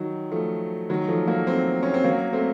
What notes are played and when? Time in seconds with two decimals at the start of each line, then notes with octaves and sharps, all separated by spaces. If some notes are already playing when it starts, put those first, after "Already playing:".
Already playing: D#3 F#3
0.31 F3 A3
0.89 D#3 F#3
1.08 F3 A3
1.28 F#3 A#3
1.47 A3 C4
1.83 C#4
1.94 C4
2.04 F#3 A#3
2.33 A3 C4